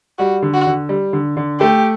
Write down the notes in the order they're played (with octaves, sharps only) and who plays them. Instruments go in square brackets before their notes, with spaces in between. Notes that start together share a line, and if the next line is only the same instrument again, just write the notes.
[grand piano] G3 [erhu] F#4
[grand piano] D3
[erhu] F#4
[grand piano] D3
G3
D3
D3
[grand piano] A3 [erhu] G4